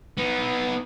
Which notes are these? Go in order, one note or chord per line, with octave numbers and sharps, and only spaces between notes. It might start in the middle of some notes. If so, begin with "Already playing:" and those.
B3 D#4